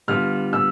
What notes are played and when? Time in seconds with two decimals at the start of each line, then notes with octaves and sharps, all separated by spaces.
0.08 D3 G3 B3 F4 F6
0.53 E6